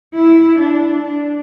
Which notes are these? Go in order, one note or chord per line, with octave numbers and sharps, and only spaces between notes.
E4
D4
D4